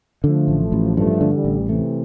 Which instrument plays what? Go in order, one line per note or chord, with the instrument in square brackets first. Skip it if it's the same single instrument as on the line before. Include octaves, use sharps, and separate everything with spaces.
[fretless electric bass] D3 [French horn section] F3 A3
[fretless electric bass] A1
A1
[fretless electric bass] G2 [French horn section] F3 A3
[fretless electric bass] D3
[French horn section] E3 G3
[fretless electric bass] A1
[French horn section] C3 E3 [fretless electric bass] A3